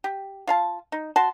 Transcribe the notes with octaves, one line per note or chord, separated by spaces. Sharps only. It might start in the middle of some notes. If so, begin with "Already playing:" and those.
G4
F4 F5 A5
D#4
F#4 A5 C6